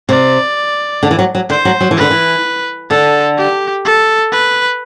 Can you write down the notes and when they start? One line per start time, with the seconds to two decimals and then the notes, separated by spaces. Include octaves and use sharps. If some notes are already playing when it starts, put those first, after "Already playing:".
0.09 C3 D5
1.03 D3
1.11 E3
1.19 F#3
1.35 F#3
1.50 D3 C5
1.65 F#3
1.81 F#3
1.91 E3
1.97 D3 B4
2.11 E3
2.90 D3 A4
3.38 G4
3.85 A4
4.32 B4